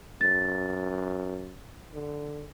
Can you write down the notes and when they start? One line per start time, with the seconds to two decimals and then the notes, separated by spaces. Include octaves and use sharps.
0.21 F#2 A6
1.94 D3